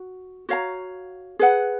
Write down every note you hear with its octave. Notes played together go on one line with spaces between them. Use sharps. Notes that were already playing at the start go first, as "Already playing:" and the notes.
Already playing: F#4
F#4 C#5 F5 A#5
G#4 B4 F#5